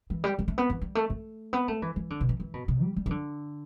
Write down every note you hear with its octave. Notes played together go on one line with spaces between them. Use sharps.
E3
G3
G3
A3
B3
E3
G3
A3
A3
B3
A3
E3
E3
D3
B2
E3
E3
B2
B2
G3
G3
E3
D3